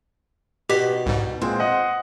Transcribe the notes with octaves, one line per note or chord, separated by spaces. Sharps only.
B2 D#3 G4 B6
C2 G#2
A#2 G#3 C4 C5
D#5 F#5